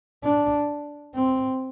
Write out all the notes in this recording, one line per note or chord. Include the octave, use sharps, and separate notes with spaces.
D4
C4